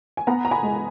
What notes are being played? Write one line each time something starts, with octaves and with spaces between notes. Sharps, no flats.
G#5
B3 F#5 A#5
A#5
G#5 B5
G#3